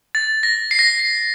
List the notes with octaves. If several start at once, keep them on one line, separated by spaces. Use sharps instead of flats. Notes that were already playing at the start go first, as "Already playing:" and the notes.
A6
A#6
C7
A#6
C7
C7